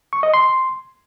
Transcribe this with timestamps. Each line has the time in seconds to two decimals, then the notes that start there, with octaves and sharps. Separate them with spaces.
0.13 C#6
0.23 D#5
0.34 C6